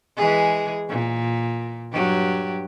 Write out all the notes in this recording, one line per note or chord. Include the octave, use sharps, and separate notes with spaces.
E3 G#3 G#4
A#2
G2 F#3 G4